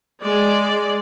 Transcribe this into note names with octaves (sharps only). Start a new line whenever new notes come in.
G#3 D5